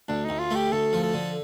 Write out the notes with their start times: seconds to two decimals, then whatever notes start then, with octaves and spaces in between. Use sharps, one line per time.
0.09 D2 D4
0.24 D2 D#4
0.39 F4
0.51 A3 G4
0.72 D2 A4
0.93 F3
1.03 A4
1.14 D3